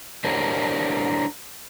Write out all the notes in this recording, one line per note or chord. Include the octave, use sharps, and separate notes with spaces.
D4 E4 G4 A#4 C5 C#5